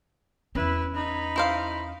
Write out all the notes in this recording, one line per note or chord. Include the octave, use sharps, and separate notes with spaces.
E2 C#4 E4 B4
D#4 B5
E4 C5 F5